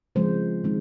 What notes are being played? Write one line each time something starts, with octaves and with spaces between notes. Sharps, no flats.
C#3 F3 G#3 C4 C5
D#3 G#3 C4